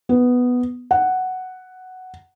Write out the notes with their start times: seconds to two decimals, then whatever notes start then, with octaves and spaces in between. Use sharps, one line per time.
0.09 B3
0.91 F#5